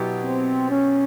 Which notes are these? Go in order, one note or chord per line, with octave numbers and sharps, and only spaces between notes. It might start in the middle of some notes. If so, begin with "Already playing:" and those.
Already playing: B2 F#3 B3 E4 G4
C4
C#4